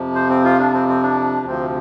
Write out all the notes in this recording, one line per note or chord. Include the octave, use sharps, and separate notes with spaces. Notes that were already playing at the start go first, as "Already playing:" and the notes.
Already playing: F2 C3 F3
C5
C4
F4
D4
C4
C4
D4
D2 C3 F3 C4